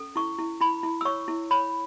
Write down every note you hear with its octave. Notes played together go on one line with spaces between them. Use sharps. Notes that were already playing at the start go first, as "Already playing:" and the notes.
Already playing: C#4 A4
E4 C#6
E4
E4 B5
E4
E6
C#5 C#6
E4
C#5 B5